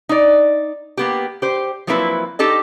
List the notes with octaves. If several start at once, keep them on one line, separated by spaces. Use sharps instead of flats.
D#4 D5
A#3 B3 G4
G4 C5
F3 F#3 A#3 C4 E4 B4
D#4 G4 A4 D#5